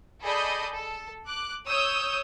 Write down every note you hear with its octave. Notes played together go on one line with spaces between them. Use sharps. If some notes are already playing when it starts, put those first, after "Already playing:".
G#4 A4 D5 D#5 B5 G6
A4
D6 F#6
C#5 D#6 E6 G6